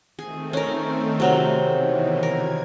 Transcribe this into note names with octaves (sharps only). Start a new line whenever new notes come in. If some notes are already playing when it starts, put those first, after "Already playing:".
D#3 A3 C4 G#4
C#4 A#4
C3 F#3 A#4
B2 D#3 E3
A#4 G#6